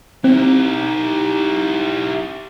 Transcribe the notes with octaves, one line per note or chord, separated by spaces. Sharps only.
C4 D#4 E4 G4